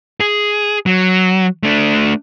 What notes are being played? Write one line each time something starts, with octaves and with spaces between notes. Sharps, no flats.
G#4
F#3
A3 D4